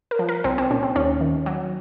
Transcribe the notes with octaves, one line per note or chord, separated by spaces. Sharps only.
A#4
F3
A#4
C2 C4
C4
A#2 C#4
C4
D#2 C#4
D#3
F#3